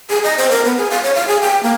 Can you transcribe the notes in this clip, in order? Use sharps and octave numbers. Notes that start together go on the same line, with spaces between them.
G#4
D#5
C5
A#4
B3
G#4
F5
C#5
F5
G#4
G5
A#3